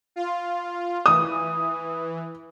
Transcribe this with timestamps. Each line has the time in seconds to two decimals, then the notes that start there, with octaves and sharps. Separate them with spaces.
0.16 F4
1.06 E3 D#6